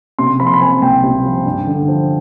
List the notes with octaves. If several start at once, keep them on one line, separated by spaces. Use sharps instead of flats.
C3 C6
F3 B5
C6
B5
C4 G#5
C2 G5
C3
F3
G2
D3
F3